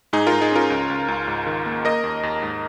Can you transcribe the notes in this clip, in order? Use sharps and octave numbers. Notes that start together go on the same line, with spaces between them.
G#2 D#4 G#4
F4 A#4
G#2
D#4 G#4
C#4 F4 A#4
C#2
C#2
C#2
G#2
D#3
A#3
A#3 A#4 D#5
D#2
D#2
G#2